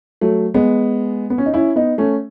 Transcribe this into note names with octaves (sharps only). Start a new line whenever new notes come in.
F#3 A3
G#3 B3
B3
C#4
D#4
C#4 E4
B3 D#4
A3 C#4